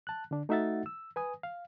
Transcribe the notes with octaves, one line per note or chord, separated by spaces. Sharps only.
A5 F#6
D3 D4
A3 D#4 F#4 E5 F#5 A6
E6
B4 G#5 D#6
F5